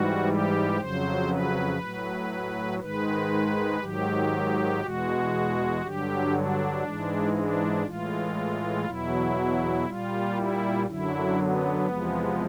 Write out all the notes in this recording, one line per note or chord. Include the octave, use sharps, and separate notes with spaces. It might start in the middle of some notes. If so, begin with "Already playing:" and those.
Already playing: G#2 E3 G3 F#4
G4
F2 C#3 F#3 C5
B4
A2 F#3
G#2 D#3 G#3 B4
G#2 D#3 F#3 G4
E2 B2 G#3 F#4
G2 D3 F#3 G4
D4
G#2 E3 G#3
D4
A2 E3 G#3 F4
E2 B2 F#3 E4
A#2 G3 F4
E4
F#2 D3 F#3 E4
B3
E2 C3 F3 G#3